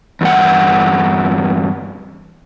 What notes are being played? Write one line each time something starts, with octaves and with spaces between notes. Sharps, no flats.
E2 G2 F#5